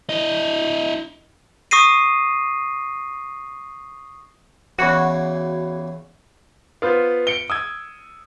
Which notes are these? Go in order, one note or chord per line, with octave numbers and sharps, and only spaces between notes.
E4 D#5
C#6 D#6 A#6 C7 D#7
E2 C#3 E3 F#4
B3 F4 B4 C5
C#7 D7 G7
D#6 E6 G#6